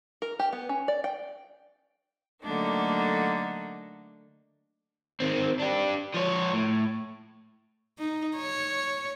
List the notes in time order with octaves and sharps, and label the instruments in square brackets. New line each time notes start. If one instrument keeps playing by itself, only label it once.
[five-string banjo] A#4
G4
B3
C#4
D5
G5
[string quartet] D3 F#3 A3 A#3 D4 D#4
[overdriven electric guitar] D#3 C4
D4 G4
F3 C#5
A2
[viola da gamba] D#4
C#5